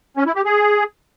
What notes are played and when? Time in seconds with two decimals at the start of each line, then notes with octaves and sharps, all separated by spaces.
0.17 C#4
0.26 E4
0.35 G4
0.45 G#4